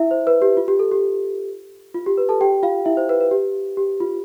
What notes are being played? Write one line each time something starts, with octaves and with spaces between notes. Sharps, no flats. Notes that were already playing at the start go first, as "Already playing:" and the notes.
Already playing: E4 E5
C5
B4
G4
F4
G4
A4
G4
F4
G4
B4
A4 A5
G4 G5
F4 F5
E4 E5
C5
B4
B4
G4
G4
F4